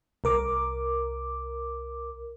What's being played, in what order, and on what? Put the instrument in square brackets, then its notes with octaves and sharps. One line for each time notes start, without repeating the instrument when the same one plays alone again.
[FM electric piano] C2 A#4 D6